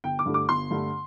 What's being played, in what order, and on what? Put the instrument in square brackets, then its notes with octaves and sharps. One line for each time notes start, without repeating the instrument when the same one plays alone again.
[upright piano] G1 G5
D6
G2 D3 A3
D6
G1 C6
G2 D3 A3